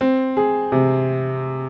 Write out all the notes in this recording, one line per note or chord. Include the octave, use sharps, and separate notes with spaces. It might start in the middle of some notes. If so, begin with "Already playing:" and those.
C4
G#4
C3